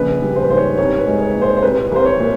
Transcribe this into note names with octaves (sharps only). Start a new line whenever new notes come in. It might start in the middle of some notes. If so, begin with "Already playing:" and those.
Already playing: A#1 C#3 B4
G3
C5
B4
G#2 C5
C#5
C2 C#5
B4
G#3
C#5
A#2
C5
C5
C2 B4
C2 C5
C#5
A#2